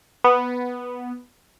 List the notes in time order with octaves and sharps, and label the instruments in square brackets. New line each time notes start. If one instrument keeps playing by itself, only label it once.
[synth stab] B3